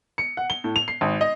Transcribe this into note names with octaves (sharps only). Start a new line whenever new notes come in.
C#7
F#5
G7
A2
F7
C7
G#1
D#5